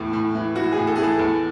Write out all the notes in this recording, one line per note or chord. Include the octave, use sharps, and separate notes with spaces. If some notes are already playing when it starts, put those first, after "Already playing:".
Already playing: E2 A2
A2
E3
E3 F#4
G#4
A2
A4
G#4
E3
A4
E2